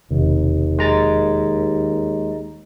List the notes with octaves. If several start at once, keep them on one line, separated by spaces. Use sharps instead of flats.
E1 D#2 C3 D#3
G#3 A#5 A6